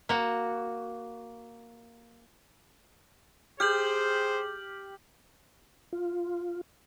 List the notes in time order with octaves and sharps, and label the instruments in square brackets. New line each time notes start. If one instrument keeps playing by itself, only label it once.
[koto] A#3 F#4
[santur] G4 [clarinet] G#4 [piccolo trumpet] C5 [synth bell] F6 G6 F#7
[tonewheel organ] F4